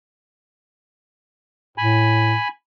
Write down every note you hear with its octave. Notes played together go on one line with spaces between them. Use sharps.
A2 G#5 B5